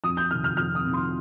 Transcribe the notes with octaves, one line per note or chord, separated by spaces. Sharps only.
F2 D#6
G6
C3 D#3 F6
F6
F2 F6
D#6
C3 D#3
C6